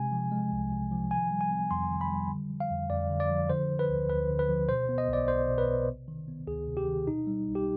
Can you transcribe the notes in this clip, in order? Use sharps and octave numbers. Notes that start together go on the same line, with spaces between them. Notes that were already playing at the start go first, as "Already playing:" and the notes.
Already playing: C3 G#3 G#5
F3
G#3
C2
C3
F3
D#3 G#5
G3
G#5
B3
F2 C6
D#3
B5
G3
D3
F3
F5
F2
F2 D5
D3
D5
F3
D3 C5
F3
B4
D2
D2 B4
D3
B4
F3
B2 C5
B3
D#5
B1 D5
B1 C5
B2
B4
B3
C3
D#3
B3
D2 G#4
C3
G4
D#3
B2 D#4
G3
B1
G4